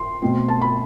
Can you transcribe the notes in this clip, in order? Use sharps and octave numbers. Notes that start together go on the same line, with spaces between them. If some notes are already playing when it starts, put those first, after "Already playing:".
Already playing: C6
B2 A3 C4
A5
B5